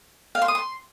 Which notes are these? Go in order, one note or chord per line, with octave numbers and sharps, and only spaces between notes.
F5
C6
D#6
C6